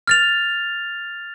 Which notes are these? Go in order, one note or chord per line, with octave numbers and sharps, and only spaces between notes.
F6 A6 F7